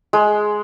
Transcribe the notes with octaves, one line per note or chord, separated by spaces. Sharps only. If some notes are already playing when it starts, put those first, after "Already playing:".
G#3